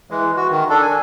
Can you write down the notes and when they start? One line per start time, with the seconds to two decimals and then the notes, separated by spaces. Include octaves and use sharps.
0.11 E3 G#3
0.36 F#4
0.50 D#3
0.70 D4 A4
0.82 G#5